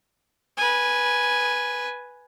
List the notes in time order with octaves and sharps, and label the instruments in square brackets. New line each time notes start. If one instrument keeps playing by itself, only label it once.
[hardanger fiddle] B4 G#5